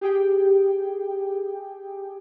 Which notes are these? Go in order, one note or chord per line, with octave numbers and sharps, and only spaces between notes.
G4 G#4 G5